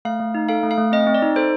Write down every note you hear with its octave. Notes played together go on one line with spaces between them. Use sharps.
A3 F5
A3
D#4
A4 F5
A3
F5
A3
C4 D#5
C4
D5
D#4
A4 C5